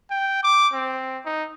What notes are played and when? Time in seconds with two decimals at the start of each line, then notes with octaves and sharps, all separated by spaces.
0.10 G5
0.43 D6
0.73 C4
1.25 D#4